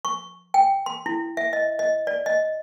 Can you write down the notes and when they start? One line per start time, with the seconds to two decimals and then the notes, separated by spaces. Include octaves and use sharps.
0.05 C#6
0.54 G5
0.86 C6
1.06 E4
1.37 E5
1.53 D#5
1.79 D#5
2.07 D5
2.26 D#5